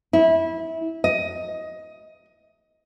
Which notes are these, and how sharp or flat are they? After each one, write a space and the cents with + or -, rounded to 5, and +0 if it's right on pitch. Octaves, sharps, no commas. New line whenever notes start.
E4 -20
D#5 +15